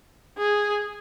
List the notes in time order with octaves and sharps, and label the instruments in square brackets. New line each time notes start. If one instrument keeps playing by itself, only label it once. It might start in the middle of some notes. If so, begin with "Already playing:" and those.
[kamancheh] G#4